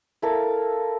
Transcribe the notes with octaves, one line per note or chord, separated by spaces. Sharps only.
E4 A4 A#4 F5